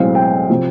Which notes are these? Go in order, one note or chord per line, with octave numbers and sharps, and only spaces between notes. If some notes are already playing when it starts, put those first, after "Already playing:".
Already playing: B1 A2 E3 G#3 C4 F5
G5
C3 F3